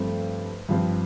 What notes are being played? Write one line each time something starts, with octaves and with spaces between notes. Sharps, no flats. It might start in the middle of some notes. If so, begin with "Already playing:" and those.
Already playing: G2 F3 A3 C4 C5
G2 F3 C4